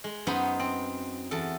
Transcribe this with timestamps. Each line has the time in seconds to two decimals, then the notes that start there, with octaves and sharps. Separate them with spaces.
0.04 G#3
0.27 F#2 B3 D#4 C5 B5
0.60 C4
1.31 E2 A4